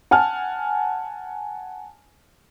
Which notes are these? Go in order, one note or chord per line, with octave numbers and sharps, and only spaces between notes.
F#5 G#5 A5 F6